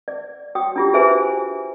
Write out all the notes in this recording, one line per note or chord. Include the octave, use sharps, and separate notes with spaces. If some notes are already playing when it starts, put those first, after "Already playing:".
D5
F#4 C#5 G5 D#6
D4 F4 G4
F#4 G#4 B4 C5 E5 G#5